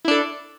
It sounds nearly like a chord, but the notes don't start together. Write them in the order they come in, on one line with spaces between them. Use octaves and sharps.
E4 D4 A4